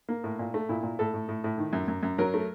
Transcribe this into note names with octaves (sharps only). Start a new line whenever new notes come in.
A#3
A2
A#2
A3
A#2 E4
A#2
A2 A4
A2
A2
A2
D#3
F#2
F#2
F#2
F#3 A#4
A3